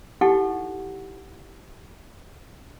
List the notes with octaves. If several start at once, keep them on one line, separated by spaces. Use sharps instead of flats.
D#4 E4 G4 A4 F#5 C#6